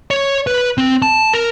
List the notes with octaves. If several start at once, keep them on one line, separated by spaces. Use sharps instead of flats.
C#5
B4
C4
A5
A#4